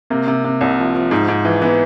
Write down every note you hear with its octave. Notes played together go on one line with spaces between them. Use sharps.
C3 A#3
C3
C3
C2
F3
F3
G#2
G#2
E3
E3 B3